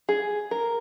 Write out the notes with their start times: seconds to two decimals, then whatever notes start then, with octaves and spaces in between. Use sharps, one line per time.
0.09 G#4
0.51 A#4